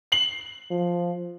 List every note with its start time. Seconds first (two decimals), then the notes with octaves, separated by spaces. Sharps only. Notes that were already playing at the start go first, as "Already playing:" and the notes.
0.12 C7 F#7
0.70 F3